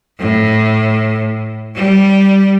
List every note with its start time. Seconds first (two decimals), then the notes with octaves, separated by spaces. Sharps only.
0.20 A2
1.76 G3